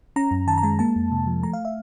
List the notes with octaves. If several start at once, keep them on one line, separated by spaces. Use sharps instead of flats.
C#4 A#5
F#2
D#3 A5
A#5
G#3 A5
A#3 A5
F2
C3
F3
A3 A#5
F5
E5